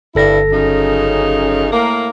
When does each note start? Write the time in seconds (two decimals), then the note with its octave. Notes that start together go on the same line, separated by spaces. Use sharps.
0.15 G1 G2 D4 E4 A4 A#6
0.51 F#2 C#3 D#4
1.72 A2 A#3